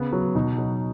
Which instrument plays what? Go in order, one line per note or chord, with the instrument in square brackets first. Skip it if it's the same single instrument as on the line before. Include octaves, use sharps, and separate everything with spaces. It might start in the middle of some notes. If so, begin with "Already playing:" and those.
Already playing: [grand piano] C#3 B3
F#3
B2 D#4
F#3